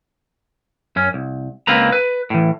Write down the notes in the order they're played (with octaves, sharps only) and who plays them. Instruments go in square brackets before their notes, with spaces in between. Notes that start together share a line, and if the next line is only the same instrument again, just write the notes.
[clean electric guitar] F#2 C#4
C2
C#2 A#3 C4 B4 A#5
B4
A2 E3